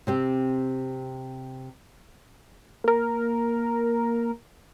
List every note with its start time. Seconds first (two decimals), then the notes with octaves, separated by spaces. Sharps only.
0.07 C3 C4 G4
2.84 A#3 A#4